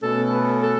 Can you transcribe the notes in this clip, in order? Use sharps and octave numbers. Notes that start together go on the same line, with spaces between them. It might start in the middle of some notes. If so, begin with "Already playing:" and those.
B2 A3 C#4 A4
B4
A4